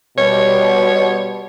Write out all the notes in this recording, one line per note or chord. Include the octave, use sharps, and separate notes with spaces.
B2 G3 C#5